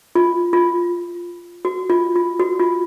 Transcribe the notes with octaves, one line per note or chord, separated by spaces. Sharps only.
F4
F4
F#4
F4
F4
F#4
F4